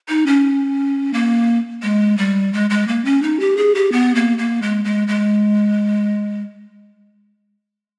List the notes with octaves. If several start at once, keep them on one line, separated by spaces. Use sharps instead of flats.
D#4
C#4
A#3
G#3
G3
G#3
G#3
A#3
C#4
D#4
G4
G#4
G4
B3
A#3
A#3
G#3
G#3
G#3